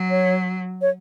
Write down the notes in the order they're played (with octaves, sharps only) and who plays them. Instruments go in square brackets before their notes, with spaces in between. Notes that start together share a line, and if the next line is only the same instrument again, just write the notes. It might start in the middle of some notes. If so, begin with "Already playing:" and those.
Already playing: [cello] F#3
[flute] C#5
C#5